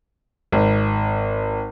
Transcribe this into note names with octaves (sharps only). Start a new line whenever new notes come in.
G#1